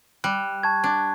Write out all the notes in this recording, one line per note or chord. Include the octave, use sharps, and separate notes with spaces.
G3 F#6
A5 C#6 G#6
D4